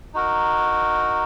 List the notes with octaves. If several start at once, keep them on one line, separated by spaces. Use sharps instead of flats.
D#4 F#4 A#4